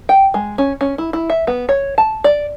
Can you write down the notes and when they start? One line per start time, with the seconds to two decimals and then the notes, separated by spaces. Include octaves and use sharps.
0.09 G5
0.34 G#3
0.58 C#4
0.81 C#4
0.98 E4
1.13 E4
1.30 E5
1.47 B3
1.69 C#5
1.98 A5
2.24 D5